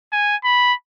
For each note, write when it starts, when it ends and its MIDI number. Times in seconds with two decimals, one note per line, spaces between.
0.13 0.36 80
0.44 0.73 83